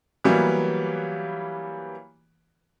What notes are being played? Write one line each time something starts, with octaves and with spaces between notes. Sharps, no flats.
E3 F#3 G3 A#3 B3